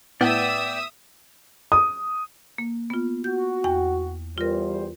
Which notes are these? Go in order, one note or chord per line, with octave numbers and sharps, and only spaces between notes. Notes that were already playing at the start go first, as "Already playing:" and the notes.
A2 B3 D5 E5 G5 D#6 E6
D#6
A#3
B3 F4
F#4 G6
E2 G5
E2 G3 F4 A#4 C5